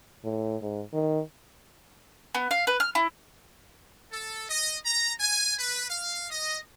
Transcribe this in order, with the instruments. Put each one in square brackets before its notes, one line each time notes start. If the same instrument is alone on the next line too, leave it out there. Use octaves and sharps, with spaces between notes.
[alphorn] A2
G#2
D#3
[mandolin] B3
F5
B4
F6
E4
[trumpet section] A4
D#5
A#5
G#5
B4
F5
D#5